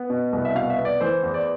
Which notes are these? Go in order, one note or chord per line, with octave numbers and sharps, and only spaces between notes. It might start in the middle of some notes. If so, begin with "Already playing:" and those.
Already playing: B3
B2
C2
E5
B2 F5
E5
B3
D5
E3 C5
E2
D5